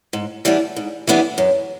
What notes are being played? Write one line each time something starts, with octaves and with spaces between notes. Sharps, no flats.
G#2
E3 G3 B3 D4
G#2
E3 G3 B3 D4
F#2